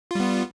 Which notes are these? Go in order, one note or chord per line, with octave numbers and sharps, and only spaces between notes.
G3 B3 F4